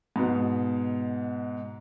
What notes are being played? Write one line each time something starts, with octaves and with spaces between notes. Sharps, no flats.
G#2 B2